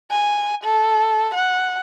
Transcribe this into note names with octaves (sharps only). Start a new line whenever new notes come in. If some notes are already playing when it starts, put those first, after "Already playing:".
G#5
A4
F#5